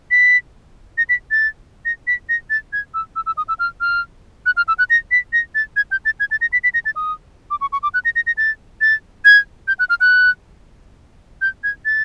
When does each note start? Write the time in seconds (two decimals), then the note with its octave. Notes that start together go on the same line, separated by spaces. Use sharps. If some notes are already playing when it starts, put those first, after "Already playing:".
0.11 B6
0.98 A#6
1.09 B6
1.31 A6
1.85 A#6
2.07 B6
2.29 A#6
2.50 A6
2.73 G#6
2.94 E6
3.16 E6
3.26 E6
3.37 D#6
3.48 E6
3.59 F6
3.81 F6
4.46 F#6
4.57 F6
4.68 E6
4.79 F#6
4.90 A#6
5.11 B6
5.33 A#6
5.55 A6
5.76 G#6
5.92 G6
6.05 A6
6.20 G#6
6.31 A6
6.41 A#6
6.53 B6
6.64 B6
6.74 A#6
6.85 A6
6.96 D#6
7.51 D6
7.61 C#6
7.72 C#6
7.83 D6
7.94 F#6
8.05 A#6
8.16 A#6
8.27 A#6
8.37 A6
8.81 A6
9.25 G#6
9.68 G6
9.79 F#6
9.90 F6
10.01 F#6
11.42 G6
11.64 G#6
11.85 A6